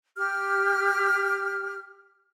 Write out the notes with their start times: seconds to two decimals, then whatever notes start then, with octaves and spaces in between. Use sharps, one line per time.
0.17 G4 F6